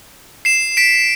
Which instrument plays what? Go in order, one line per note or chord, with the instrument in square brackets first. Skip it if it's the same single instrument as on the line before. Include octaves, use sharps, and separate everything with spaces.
[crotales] C7 E7
B6 D7